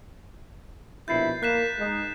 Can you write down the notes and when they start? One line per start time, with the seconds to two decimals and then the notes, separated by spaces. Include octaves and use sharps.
1.08 A#1 B2 E4 G6 A6 C7
1.43 A#3 F#6 B6 E7
1.78 G#3 D#4